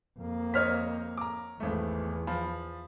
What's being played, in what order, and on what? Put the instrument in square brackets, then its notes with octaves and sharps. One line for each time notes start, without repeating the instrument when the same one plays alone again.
[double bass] F2 A#3
[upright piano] C5 D#5 [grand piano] C#5 F6 B6
[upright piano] A#5 D6
[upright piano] G#1 A3 [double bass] E2
[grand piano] F3 [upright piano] B5